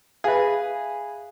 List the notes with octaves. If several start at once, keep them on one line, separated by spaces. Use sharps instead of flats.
G#4 B4 E5 F5